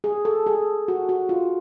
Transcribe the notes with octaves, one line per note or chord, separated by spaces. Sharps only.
G#4
A4
G#4
F#4
F#4
F4